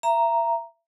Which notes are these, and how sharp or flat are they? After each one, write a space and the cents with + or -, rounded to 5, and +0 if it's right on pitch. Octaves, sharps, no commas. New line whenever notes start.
E5 +30 A#5 +0